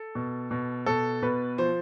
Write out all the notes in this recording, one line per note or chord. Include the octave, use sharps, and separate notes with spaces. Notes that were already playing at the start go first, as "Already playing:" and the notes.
Already playing: A4
B2
B2
B2 A4
B2 B4
F3 C5